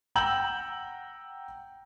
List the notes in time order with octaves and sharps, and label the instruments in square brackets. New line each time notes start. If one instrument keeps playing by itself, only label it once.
[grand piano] F#5 G5 A#5 E6 G6 F#7